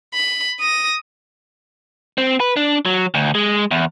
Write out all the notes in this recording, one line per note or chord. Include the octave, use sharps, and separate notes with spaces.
B5
D#6 A#6
C4
B4
D4
F#3
D2
G#3
E2